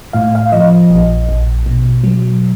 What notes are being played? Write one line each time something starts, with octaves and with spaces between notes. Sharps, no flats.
A2 F5
F5
F3 D#5
A#1
A#1
B2
F#3